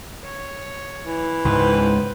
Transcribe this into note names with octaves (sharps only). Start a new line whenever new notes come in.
C#5
E3
C#2 G#2 B4 C5